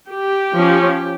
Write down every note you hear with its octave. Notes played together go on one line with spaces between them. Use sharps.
G4
F3 C#4